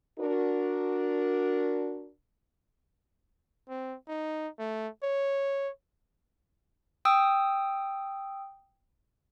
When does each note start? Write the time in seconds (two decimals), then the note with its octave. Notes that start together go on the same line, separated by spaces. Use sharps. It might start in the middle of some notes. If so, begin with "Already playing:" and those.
0.20 D4 F#4 A#4
3.69 C4
4.08 D#4
4.59 A3
5.03 C#5
7.05 G5 D#6 E6